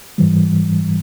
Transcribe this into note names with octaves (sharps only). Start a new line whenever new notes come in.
G#2 E3 G3